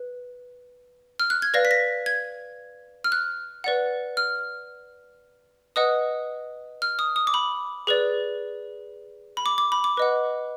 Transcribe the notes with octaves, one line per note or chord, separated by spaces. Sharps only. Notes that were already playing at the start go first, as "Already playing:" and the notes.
Already playing: B4
F6
F#6
G#6
B4 D5 F5 A#6
B6
A#6
G#6
F6
F#6
B4 D5 F#5
F6
B4 D#5 F#5 D#6
F6
D#6
D#6
D6
B5
G#4 B4 D5
B5
D6
D6
B5
D6
B4 D#5 F#5